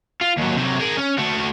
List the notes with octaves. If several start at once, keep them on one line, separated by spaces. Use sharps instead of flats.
F4
D#2 F#3
C3 F#3
G#4 A#4
C#4
A3 F#4